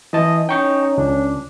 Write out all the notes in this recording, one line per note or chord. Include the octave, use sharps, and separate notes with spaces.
E3 D#5 A5
C#4 D#4 G5 C#6 G6
C#2 D4